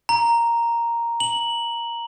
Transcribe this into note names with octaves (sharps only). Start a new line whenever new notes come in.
A#5
F#7